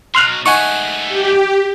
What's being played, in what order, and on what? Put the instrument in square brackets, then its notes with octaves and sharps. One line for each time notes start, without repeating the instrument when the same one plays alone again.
[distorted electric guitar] B2 F#3 [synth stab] C6 F6 F#6
[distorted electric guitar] G#2 A3 [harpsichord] D#4 F#5 G#5 [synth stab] C#6
[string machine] G4